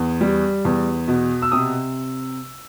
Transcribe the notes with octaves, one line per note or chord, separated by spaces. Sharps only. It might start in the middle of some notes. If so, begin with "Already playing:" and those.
Already playing: E2
G3
E2
B2
E6
C3 D#6